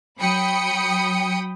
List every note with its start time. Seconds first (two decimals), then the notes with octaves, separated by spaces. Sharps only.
0.18 F#3 G5 B5 D#6 C#7